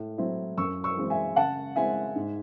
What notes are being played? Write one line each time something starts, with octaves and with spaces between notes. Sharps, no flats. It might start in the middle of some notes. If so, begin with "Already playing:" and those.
Already playing: A2
F#3 C4 E4
F#2 C#6 E6
C#6 E6
E3 G#3 C4
E5 G#5
C#3 F#5 A5
G#3 C4 E4 E5 G#5
G#2